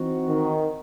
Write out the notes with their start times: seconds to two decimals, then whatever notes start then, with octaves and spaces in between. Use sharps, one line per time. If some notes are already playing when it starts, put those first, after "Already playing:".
Already playing: E3 C4 D#4 F#4
0.27 D#3